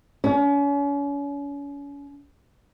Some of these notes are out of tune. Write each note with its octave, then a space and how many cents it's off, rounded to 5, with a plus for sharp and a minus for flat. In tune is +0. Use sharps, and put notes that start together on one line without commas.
C#4 +35